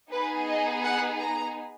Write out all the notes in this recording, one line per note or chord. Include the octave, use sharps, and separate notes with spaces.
B3 D#4 G#4 B4
D#5
F#5
A#5